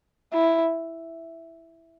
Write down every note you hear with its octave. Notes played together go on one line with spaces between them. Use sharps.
E4